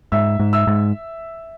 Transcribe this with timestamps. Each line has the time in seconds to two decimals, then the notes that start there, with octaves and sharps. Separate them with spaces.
0.12 G#2 E5 E6
0.40 G#2
0.53 E5 E6
0.67 G#2